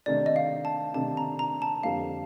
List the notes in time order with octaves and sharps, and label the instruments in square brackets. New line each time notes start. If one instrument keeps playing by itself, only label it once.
[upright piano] C3 D#3 A3 D4 [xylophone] D5
[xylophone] D#5
F5
A5
[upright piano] C3 D#3 A3 D4 [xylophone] A5
[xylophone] A#5
A#5
A5
[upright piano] F2 D3 G3 A#3 D#4 [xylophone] F5